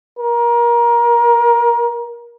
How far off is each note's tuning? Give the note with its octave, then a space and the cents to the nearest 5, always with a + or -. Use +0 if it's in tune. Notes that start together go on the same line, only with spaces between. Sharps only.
A#4 +25